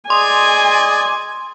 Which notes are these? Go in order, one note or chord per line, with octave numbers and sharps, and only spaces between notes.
G#4 D5 D#5 G#5 C6